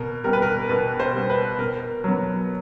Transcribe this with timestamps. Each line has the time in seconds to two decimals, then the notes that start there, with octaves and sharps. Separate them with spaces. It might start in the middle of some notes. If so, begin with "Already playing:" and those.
Already playing: B2 A#4
0.24 G3 B3 A#4
0.33 B4
0.42 A#4
0.69 B2 B4
1.00 C5
1.14 G3 B3
1.30 B4
1.59 B2 A#4
2.04 F#3 B3